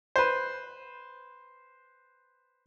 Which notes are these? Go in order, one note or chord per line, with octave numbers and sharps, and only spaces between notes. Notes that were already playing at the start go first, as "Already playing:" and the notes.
B4 C5